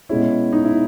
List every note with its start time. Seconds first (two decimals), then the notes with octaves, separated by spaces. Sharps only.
0.09 B2 G#3 C#4 E4
0.53 D#4
0.65 E4